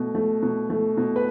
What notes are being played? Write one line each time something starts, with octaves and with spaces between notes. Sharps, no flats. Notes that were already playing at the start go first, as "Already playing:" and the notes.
Already playing: B2 A3
A3
B2
A3
B2
B4